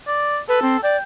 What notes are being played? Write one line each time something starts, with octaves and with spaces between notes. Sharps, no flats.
D5
A4 B4
C4
D5 G5